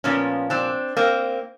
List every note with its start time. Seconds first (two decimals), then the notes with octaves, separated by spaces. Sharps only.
0.04 A#2 F3 B3 C#4
0.50 C4 D4
0.97 A#3 C4